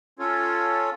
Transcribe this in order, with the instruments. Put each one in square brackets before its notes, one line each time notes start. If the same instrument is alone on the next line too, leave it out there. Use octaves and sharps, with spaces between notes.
[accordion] C#4 F4 A4 C#5